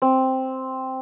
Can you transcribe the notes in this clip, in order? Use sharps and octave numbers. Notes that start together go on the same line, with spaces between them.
C4